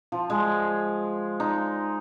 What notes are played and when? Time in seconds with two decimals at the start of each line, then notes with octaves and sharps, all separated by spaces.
0.12 F3
0.30 G#3
1.40 D#4